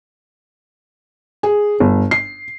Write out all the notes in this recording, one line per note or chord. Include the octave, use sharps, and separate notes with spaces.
G#4
G1
C7